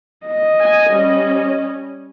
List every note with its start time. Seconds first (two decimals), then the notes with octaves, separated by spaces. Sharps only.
0.26 D#5
0.61 G#5
0.90 G3 C#4